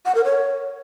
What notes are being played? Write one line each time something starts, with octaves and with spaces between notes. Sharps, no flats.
F#5
A#4
C#5